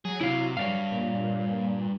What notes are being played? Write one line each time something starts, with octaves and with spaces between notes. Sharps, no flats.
F#3 G#4
C3 F#3 E4 F5
G2 C#5 D5 F5
A#2